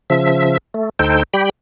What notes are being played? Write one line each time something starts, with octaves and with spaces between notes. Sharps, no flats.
C#3 F3 E5
A3
D2 D#4 A4 C5 G5
G3 G4 G5 B5